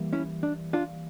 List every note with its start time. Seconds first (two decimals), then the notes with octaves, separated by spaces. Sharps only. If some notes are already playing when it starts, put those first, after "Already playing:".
Already playing: E3 G3 A#3
0.13 C#4 E4
0.43 D4
0.73 D4 F4